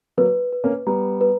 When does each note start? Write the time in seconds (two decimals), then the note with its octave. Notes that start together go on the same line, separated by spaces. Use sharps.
0.17 F#3 A#3 B4
0.53 B4
0.64 A#3 C#4
0.87 G3 B3 A#5
1.21 B4